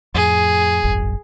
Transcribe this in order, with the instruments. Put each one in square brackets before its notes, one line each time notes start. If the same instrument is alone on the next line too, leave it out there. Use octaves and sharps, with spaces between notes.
[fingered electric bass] F2 A2 [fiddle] G#4
[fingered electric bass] D#1 G#1 F#2